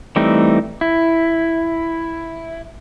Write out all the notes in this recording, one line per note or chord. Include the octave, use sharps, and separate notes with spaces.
E3 G3 A3 C4 D#4
E4